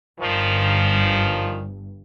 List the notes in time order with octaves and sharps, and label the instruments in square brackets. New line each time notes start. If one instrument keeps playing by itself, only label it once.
[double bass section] G1 G2 [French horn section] A#2 D#3 F3